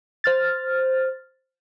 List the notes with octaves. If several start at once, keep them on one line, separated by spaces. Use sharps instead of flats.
C5 F6 A6